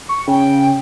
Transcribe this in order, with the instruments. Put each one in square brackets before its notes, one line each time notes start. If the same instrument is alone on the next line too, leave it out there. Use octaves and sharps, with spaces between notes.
[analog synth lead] C#6
[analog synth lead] C#3 [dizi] G5